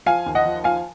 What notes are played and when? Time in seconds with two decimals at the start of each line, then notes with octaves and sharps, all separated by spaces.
0.06 F3 F5 G#5
0.26 D#2
0.35 D#5 F#5
0.45 F3
0.64 F3 F5 G#5